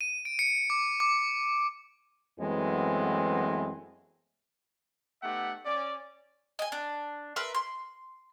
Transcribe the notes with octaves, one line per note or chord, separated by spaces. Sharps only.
D#7
D7
C#7
D6
D6
F#2 E3 G#3 A3 B3 C4
A3 B3 D#4 G4 E5 F#5
C#4 D5
D#5 G#5
D4
A#4 B4 E5 C6
C6